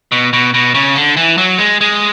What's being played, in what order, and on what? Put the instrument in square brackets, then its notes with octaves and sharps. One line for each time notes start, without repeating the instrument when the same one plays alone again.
[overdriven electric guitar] B2
B2
B2
C#3
D3
E3
F#3
G#3
G#3